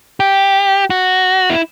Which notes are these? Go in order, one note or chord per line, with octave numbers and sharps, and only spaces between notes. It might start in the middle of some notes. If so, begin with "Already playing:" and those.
G4
F#4
E4